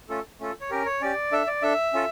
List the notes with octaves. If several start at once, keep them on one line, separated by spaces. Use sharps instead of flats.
A3 C#4 F4 A4
A3 C#4 F4 A4
C#5
C#4 G4 A#4
C#5
C#4 G4 D5
D4 A4 E5
D5
D4 A4 E5
C#4 F4 A4